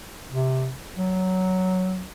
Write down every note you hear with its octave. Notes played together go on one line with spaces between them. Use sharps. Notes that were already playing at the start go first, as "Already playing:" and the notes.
C3
F#3